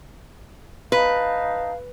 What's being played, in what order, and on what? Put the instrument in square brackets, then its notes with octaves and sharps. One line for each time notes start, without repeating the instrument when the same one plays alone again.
[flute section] D#4 F5 A5 [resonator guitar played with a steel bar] B4